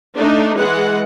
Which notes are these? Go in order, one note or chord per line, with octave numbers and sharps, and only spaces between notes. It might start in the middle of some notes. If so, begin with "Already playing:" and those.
A3 D4 D#4
E3 G#3 F#5